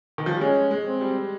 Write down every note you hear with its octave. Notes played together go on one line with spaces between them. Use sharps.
D#3
F3
G3
G#3 C#4
G#3
C4
G3